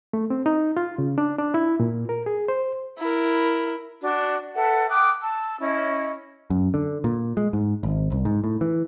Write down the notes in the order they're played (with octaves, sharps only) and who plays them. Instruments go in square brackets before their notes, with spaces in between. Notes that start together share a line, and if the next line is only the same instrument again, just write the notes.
[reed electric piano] A3
C4
D#4
F4
C#3
D4
D4
E4
A#2
A#4
G#4
C5
[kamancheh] E4 A#4
[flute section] D4 F#4
A4 B4 E5 F#5
G5 D6 D#6 F#6
A5 E6
C#4 E4 D#5
[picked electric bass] F#2
D3
A#2
G#3
G#2
G#1
C2
G#2
A2
E3